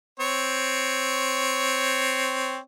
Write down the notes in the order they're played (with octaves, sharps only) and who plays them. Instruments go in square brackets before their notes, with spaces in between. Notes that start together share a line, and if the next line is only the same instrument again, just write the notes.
[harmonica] C4 C#5